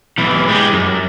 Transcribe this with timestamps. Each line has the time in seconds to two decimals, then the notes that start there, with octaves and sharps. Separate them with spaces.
0.18 B1 E3
0.48 G#3 G4
0.73 F#2